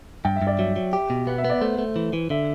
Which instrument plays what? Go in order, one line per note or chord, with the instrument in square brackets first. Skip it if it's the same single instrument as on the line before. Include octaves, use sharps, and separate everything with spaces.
[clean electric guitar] G2 [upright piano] G5
[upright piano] E5
[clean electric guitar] G2
[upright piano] D5
[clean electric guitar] F#3 [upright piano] E5
[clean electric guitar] F#3
G4
B2
[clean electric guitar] B3 [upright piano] F#5
[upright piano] E5
[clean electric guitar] B3 [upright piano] D5
[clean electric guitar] A3 [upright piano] C5
[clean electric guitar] A3
E3
E3
[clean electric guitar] D3 [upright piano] E5